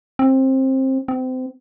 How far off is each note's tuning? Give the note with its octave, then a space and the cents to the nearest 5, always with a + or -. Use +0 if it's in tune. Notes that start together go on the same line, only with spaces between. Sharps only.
C4 +20
C4 -30